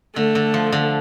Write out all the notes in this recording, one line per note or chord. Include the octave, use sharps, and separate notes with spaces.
D3 A3
D3
F3
D3